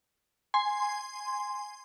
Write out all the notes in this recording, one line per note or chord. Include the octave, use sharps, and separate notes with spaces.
G#5 C6